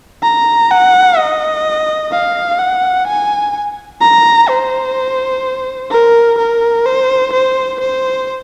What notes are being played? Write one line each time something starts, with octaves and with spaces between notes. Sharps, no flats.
A#5
F#5
D#5
F5
F#5
G#5
A#5
C5
A#4
A#4
C5
C5
C5